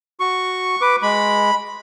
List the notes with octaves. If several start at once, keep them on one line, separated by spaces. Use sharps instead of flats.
F#4 C#6
B4 D6
G#3 B5